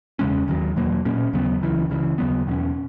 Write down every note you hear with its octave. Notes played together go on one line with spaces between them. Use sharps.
E2 C#3 G#3 C#4
D#2 D#3 F#3
E2 B2 F#3 A#3
A#2 A#3 C#4
D#2 C#3 F#3 B3
C#2 C#3 E3
C#2 C#3 E3
D#2 C#3 F#3 B3
E2 B2 A#3 C#4